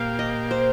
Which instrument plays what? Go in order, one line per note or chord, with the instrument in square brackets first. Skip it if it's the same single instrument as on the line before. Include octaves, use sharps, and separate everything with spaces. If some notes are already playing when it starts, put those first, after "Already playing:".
Already playing: [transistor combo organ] A#2 A#3 G4 [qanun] F5
[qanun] D#5
C5